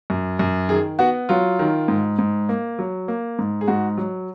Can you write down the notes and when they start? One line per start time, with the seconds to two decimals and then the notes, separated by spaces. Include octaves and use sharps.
0.10 F#2
0.39 F#2
0.69 D#3 G#4
0.99 B3 F#4
1.29 F#3 F4
1.59 D#3
1.88 G#2
2.19 G#2
2.49 A#3
2.79 F#3
3.08 A#3
3.39 G#2
3.61 G#4
3.68 G#2 F#4
3.97 F#3